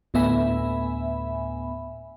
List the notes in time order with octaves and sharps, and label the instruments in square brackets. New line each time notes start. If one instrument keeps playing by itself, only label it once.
[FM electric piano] D2 A2 B3 E5 G#5 B5